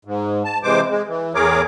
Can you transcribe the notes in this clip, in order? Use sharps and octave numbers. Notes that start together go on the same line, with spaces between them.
G#2
A5
C3 E3 G#3 C5 D6
G#3
E3
E2 A2 G#4 A#4 C#5 D6